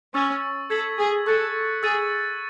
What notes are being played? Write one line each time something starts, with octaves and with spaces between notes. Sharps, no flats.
C#4 C#6 E6 A6
A4 G#6 B6 F#7
G#4
A4 C#6 F#6 A6 C#7
G#4 E6 A6 D#7